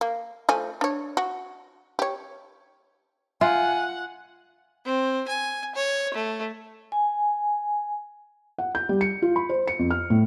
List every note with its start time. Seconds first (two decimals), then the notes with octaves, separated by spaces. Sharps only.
0.01 A#3
0.49 F3 A3 G#5
0.81 D4 C#5
1.17 F#4
1.99 G4 C#5
3.41 F4 E5 F#5 G#5
4.85 C4
5.28 G#5
5.75 C#5
6.14 A3
6.92 G#5
8.58 F#5
8.75 G6
8.89 G3
9.01 C#7
9.22 F4
9.36 B5
9.49 C5
9.67 C#7
9.79 F2
9.90 F6
10.10 A2